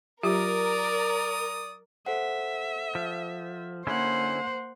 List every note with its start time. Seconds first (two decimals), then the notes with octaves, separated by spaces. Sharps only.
0.23 F#3 F4 G4 A#4 D5 D#6
2.06 A4 C5 E5 F#5
2.95 F3
3.87 D3 A#3 C#4 E4 C5 F#5